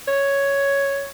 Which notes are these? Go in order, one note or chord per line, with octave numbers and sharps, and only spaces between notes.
C#5